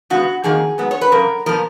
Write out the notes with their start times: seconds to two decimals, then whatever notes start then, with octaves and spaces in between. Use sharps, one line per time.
0.10 C#3 G#3 B3 F#4
0.44 F2 D#3 A#3 G#4
0.78 G#2 F#3 B3
0.91 C#5
1.01 B4
1.12 F#2 C#3 A#4
1.46 A#2 F3 B3 A#4